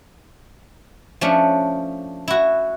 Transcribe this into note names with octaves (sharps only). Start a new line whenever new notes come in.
F3 A3 C#4 D4
E4 F#4